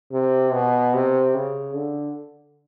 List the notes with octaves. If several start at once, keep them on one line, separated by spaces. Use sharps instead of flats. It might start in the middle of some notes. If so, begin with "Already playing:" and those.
C3
B2
C3
C#3
D3